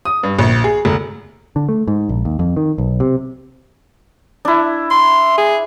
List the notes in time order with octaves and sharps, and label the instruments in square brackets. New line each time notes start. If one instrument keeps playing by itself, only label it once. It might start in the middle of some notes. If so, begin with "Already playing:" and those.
[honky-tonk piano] D#6
G2
A#1
G#4
F1
[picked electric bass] D3
A3
G#2
A#1
D#2
F2
D#3
B1
C3
[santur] D4 E4
[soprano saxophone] C6
G#4